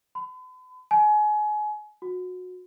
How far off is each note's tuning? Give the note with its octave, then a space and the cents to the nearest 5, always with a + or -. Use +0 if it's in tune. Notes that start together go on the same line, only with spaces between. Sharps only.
B5 +45
G#5 +30
F#4 -25